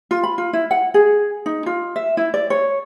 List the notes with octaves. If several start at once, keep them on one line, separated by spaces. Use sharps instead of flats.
F4
B5
F4
E4
F#5
G#4
D#4
F4
E5
E4
D5
C#5